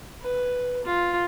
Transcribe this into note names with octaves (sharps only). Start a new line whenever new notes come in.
B4
F4